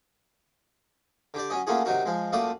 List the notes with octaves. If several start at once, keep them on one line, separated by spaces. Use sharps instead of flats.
D3 G4 D5
F#3 C#4 D#5
A3 A#3 C#4 F4 F#4 G#4
C3 D#3 F#3 D#4 F#4 A#4
F3 G#3
F#2 A3 A#3 F4 D5 D#6